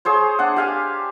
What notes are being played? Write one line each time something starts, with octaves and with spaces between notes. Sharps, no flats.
G#4 C5 C#5
D4 F#5
G4 F5 G#5